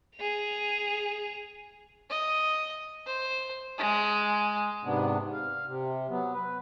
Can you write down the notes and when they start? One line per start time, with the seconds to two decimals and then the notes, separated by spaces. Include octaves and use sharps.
0.16 G#4 F7
2.10 D#5
3.06 C5
3.78 G#3
4.85 G#2 C3 B3 D4
5.33 F5
5.67 C3
6.09 F#3 B3
6.34 B4